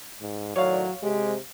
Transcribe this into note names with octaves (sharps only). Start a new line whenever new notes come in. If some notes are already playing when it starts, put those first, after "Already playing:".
G#2
A2 D#3 F#3 C#5 D5 F5
C3 G#3 G4